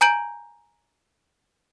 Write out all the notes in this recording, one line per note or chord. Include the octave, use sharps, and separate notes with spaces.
G#5 A#5 G6 D7 F#7